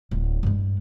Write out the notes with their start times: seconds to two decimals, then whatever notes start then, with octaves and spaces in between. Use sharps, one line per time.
0.11 D1
0.43 G2 G#3